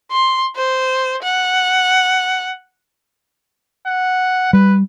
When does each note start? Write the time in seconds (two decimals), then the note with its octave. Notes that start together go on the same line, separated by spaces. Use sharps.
0.12 C6
0.56 C5
1.23 F#5
3.86 F#5
4.53 G3 B4